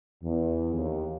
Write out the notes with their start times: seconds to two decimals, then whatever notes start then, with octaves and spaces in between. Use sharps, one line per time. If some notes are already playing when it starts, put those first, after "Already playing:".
0.23 E2
0.73 D#2